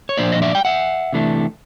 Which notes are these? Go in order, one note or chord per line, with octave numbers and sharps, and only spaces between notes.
C#5
A#2 F3 A#3 D4 C5 D5
D#5
D5 E5
G5
E5 F#5
C3 E3 A3 D4